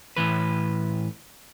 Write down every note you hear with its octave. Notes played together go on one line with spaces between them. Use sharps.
A2 E3 B4